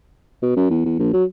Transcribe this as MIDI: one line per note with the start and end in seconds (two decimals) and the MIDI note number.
0.42 0.54 47
0.56 0.70 42
0.70 0.84 40
0.85 0.95 40
0.99 1.09 34
1.13 1.24 54